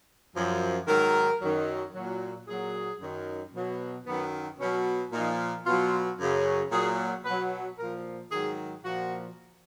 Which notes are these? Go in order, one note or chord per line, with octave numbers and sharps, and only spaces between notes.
F#2 F3
G#2 D#3 F#3 A#4
F#2 D#3 F#3
A#2 F#3
A#2 F#3 G#4
F#2 D#3 F#3
B2 F#3
F#2 D#3 F#3 B3
B2 F#3 C#4
A#2 F3 D#4
B2 F#3 F4
F#2 C#3 F#3
A#2 F#3 G#4
B2 F#3 B4
A#2 F3 A#4
G#2 D#3 F#3 G#4
A#2 F3 F#4